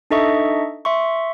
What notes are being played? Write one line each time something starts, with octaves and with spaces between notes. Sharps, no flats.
D4 D#4 A4 D#5 E5 C#6
E5 C6 C#6